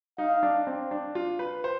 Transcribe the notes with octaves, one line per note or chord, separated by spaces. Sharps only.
D#4 F5
D4
C4
D4
F4
B4
C5